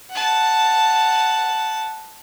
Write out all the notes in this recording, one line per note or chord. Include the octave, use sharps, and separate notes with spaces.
F#5 A5